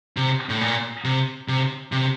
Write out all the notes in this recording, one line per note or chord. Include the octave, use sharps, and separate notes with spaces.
C3
A2
A#2
C3
C3
C3